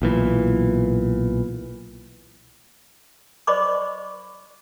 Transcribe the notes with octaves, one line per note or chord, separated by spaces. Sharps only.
B1 A#2 E3
C5 D5 D#5 B5 C#6 D6